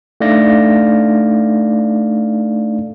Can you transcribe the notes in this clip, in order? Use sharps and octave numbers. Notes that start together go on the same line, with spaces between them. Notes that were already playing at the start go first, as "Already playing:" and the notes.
A3 D4 D#4 D5 F5 A#6